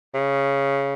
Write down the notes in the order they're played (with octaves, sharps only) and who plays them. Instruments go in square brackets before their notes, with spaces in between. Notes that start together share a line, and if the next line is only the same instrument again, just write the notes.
[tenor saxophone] C#3